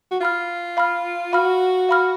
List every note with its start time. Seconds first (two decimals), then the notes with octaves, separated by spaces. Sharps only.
0.11 F#4
0.20 F4 F5 B5 F6
0.77 F5 B5 F6
1.33 F#4 F5 B5 F6
1.89 F5 B5 F6